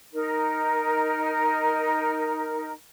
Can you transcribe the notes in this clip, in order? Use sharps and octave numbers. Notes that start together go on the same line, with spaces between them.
D#4 A#4